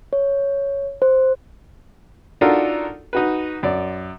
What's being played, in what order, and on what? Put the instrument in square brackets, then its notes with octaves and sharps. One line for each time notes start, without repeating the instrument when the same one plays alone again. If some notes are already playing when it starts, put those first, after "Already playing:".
[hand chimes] C#5
C5
[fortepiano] D4 D#4 F4 F#4 A4 A#4
D#4 F#4 B4
F#2 D5